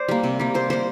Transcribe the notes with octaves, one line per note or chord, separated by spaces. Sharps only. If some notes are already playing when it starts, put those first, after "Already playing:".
Already playing: C5 D5
G3 A#3
C3
G3 A#3
C3 C5
G3 A#3 C5